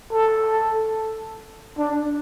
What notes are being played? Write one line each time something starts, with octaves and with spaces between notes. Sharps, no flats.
A4
D4